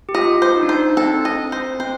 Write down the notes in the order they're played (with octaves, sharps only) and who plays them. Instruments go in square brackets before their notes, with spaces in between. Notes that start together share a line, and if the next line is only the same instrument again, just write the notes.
[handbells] G4
[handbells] F4 [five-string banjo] D#5
[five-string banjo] C5
[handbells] D#4
D4
[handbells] D#4 [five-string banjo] C5
[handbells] D4
[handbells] C4 [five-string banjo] A4
[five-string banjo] D#5
C5
[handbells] C4 [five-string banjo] C5